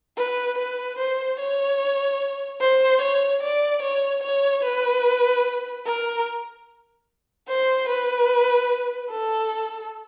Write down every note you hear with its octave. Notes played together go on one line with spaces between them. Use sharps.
B4
B4
C5
C#5
C5
C#5
D5
C#5
C#5
B4
A#4
C5
B4
A4